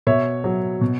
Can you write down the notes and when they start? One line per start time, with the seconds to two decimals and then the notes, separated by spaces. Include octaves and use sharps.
0.07 B2 C#5 E5
0.44 F#3
0.81 B2